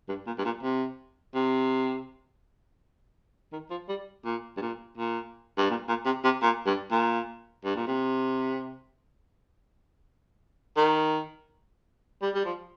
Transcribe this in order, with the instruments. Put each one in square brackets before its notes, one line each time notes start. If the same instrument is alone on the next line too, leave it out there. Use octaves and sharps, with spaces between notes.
[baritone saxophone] G2
A#2
G2
A#2
C3
C3
D#3
F3
G3
A#2
G2
A#2
A#2
G2
A#2
A#2
C3
C3
A#2
G2
A#2
G2
A#2
C3
D#3
G3
G3
F3